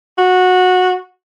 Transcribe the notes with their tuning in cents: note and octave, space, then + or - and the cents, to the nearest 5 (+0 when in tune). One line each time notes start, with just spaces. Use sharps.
F#4 -15